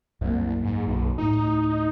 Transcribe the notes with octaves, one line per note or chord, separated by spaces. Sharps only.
C2 F#2 A#3
G#2
B1
D2 A2 D#4